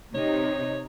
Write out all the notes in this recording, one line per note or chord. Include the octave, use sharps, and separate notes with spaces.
C3 D#4 C#5